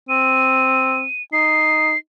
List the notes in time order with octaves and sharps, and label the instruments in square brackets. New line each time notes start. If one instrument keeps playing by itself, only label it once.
[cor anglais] C4 [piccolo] D#7
[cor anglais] D#4 [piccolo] C7